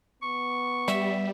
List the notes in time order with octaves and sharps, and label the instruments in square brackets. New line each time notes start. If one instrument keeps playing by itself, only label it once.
[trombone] B3 [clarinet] C#6
[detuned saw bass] G3 [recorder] E5